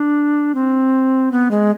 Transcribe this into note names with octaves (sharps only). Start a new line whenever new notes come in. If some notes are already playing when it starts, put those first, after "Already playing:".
Already playing: D4
C4
B3
G#3